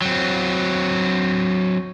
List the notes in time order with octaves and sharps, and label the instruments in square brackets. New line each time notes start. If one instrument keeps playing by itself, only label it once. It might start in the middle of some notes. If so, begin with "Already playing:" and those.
[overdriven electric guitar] F#3 C4